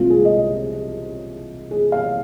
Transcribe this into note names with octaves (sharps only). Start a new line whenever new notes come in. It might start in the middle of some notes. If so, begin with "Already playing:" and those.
Already playing: C2 C3 G#3 F4
G#4
D#5
G#4
F5